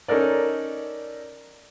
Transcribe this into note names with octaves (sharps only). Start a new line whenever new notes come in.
C#4 D#4 A4 A#4 D5